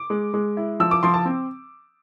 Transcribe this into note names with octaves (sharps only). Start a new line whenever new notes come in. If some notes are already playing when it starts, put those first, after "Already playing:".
Already playing: D6
G#3
G#3
E4
F3 E6
D6
F3 C6
A5
C4